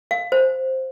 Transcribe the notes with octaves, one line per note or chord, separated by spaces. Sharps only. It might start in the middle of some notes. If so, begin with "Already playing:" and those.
F5
C5